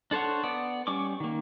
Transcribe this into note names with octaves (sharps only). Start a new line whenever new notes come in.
D4 A4 C5 C#5 F#5
B3 D5
G3 C#4 C#6 D6
D#3 A#3